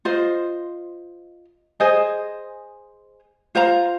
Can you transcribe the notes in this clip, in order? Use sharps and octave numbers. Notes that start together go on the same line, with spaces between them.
F4 C5 D#5
G#4 C5 D#5 G#5
F4 C5 F5 A#5